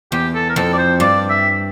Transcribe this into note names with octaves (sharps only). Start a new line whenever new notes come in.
E2 G4
A4
A#4
F2 A4
D5
C5
G2 D5
E5